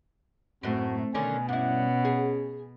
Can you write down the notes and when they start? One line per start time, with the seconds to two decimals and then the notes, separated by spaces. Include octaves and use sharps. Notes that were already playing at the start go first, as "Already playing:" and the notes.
0.63 F#2 A2 A3 C4 F#4
1.14 B2 D3 D#3 C#4 G#5
1.49 G2 C#4 E4 F#5
2.05 G#4